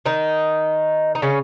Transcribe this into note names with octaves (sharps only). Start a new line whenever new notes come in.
D#3 D#4
D#4
C#3 C#4